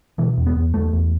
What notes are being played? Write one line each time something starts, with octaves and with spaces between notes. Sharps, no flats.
B2 E3
E2
B3
E2
E2 A3
E2